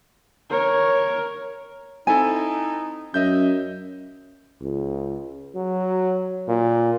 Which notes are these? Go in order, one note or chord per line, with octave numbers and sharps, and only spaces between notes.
A#4 C#5
C4 D#4 E4 A4 G#5
F#2 D#5 E5 G6
C#2
F#3
A#2